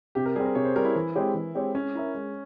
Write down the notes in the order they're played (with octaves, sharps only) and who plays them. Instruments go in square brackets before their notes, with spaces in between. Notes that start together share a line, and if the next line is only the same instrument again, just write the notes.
[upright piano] C3 [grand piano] G4
[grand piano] A#4
[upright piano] G3 [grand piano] G#4
[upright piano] C4
[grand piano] A#4
[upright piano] C3 [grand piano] C#5
[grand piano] C5
[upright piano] G3 C4 [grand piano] A#4
[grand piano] E4
[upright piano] E3
G#3 C4 G4 C#5
E3
G#3 C4 G4 C#5
[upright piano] G#3 [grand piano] C#4
[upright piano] E4 A#4 E5
G#3